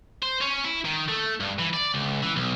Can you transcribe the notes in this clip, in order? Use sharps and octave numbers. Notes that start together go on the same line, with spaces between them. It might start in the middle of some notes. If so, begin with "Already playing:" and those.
C5
C#4
E4
D#3
A3
G2
E3
D5
C#2
E3
B1